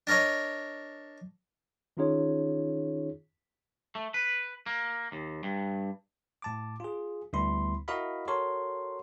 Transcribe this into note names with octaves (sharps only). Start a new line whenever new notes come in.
D4 A#4 C#5 D#5
D#3 C#4 D#4 F4 G#4 C#5
A3
B4
A#3
D#2
G2
A2 A5 D6
F4 G#4
D2 G3 B3 E4 B5 C6
E4 F#4 A#4 D#5 F5 B5
F#4 A4 A#4 C#5 C6